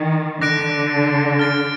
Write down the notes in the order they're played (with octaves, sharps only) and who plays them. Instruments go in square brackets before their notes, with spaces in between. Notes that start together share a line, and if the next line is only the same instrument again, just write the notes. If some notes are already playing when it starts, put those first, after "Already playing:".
Already playing: [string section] D#3
[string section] D3 [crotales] D6 F#6 A#6 D7
[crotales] F6 A6 D7